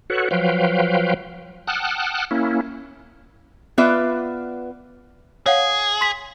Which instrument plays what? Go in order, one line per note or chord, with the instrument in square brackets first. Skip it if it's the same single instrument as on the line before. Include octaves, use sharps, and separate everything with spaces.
[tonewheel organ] F#4 A4 B4 C#5 F#5
F3 F#3 B4 F5 G5
F#5 G5 A5 D#6 F6 F#6
A#3 C#4 E4
[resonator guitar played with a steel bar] B3 F4 B4 D5 E5
[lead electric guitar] G#4 [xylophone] C#5 F5 F#5
[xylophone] C6 B6